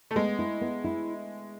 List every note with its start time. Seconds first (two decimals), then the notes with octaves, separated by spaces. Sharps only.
0.11 A3
0.16 G#3 B3
0.39 E4
0.61 B3
0.84 E4